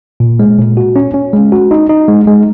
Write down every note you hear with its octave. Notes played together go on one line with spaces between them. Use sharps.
A#2
G#3
A#2
F#4
C#4
C#4
G#3
F#4
D#4
D#4
G#3
G#3